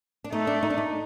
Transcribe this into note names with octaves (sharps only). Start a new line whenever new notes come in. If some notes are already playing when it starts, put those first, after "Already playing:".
D4
A3 D#4
D4
D#4
D4
D#4